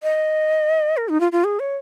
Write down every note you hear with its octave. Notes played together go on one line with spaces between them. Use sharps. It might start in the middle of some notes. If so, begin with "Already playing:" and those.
D#5
A#4
D#4
F4
F4
G#4
C#5